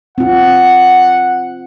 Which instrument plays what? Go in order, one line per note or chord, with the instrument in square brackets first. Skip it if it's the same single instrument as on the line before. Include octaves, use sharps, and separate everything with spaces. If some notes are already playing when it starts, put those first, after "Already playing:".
[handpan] C4 F4 [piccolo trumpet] F#5